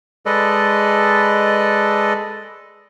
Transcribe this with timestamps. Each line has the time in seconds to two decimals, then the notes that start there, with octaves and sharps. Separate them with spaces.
0.26 G#3 A4 B4 D5 D#5